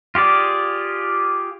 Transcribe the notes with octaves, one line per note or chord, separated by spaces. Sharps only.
F4 G4 G#4 D5